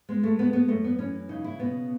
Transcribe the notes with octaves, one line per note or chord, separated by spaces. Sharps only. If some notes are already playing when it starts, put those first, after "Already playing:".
G#3 B3
A3
A3 B3
B3
F#2 A3
B3
E3 C#4
C#3 D#4
E4
B2 B3